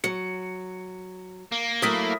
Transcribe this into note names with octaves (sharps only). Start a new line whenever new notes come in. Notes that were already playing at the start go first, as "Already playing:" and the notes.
F#3 C#7
A#3
F#3 A3 E4 A#4 D#6 B6